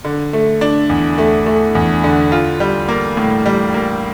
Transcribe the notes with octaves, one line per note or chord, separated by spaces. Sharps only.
D3
A3
D4
E2
A3
A3
E2
D3
F4
G3
A#3
A2
G3
A#3